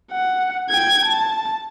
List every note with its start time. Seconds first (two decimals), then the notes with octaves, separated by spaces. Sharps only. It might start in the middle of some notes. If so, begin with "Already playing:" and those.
0.12 F#5
0.69 G5 G#6
1.05 A5